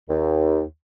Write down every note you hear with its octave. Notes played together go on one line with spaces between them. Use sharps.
D#2